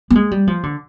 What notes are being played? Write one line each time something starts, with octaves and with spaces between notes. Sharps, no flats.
B3
G#3
G3
F3
D3